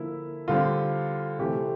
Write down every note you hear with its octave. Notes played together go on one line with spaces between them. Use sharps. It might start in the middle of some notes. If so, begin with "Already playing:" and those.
Already playing: D3 F3 A#3 E4
D3 G3 C4 F4
C3 E3 A3 C4 G4